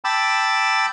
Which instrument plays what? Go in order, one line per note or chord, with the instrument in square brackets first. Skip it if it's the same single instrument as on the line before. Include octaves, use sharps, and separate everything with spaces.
[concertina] G5 A5 B5 D6 E6